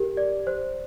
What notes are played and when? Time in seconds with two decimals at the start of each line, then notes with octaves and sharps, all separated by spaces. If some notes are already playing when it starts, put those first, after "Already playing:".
Already playing: G4 A#4
0.17 D5
0.47 C5